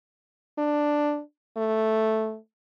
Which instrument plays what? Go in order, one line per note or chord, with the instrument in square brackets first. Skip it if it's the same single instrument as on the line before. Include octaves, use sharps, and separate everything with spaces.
[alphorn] D4
A3